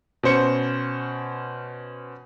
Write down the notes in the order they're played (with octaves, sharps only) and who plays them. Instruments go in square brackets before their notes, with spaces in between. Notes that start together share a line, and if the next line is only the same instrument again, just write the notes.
[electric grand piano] B2 C#4 C5 C#7